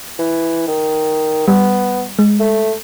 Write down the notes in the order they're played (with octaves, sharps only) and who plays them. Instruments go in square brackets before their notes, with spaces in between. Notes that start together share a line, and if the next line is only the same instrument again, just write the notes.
[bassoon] E3
D#3
[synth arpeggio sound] G3 [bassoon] B3
[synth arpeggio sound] G#3
[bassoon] A3